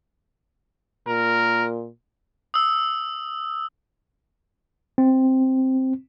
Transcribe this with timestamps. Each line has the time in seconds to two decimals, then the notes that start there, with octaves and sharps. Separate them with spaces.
1.08 A#2 A#4
2.54 D#6 E6
4.98 C4